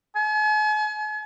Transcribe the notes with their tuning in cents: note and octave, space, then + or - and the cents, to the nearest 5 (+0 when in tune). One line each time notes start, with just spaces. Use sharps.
G#5 +45